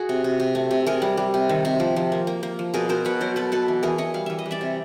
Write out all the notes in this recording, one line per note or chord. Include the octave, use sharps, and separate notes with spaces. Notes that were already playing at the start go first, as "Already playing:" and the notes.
Already playing: F#4 G#4
C3
C3
C3
A3
C3
C3 G#4 A#4
G3
G3
C3
D#3
C3
F3
F3
A#3
A#3
A#3
F3
B2 G#4 A#4
B2 A#4 C5
B2 B4 C#5
F#3 A#4 C5
B2 A4 B4
B2 A4 B4
E3
E3 G#4 A#4
E3 C#5 D#5
G3 F5
E3 E5
D#5
G3
D5 E5
C3